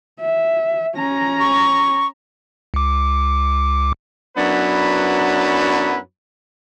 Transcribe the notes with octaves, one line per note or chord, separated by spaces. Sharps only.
E5
C#4 A#5
C#6
C#2 D6
F#2 F#3 B3 D4 E4 B4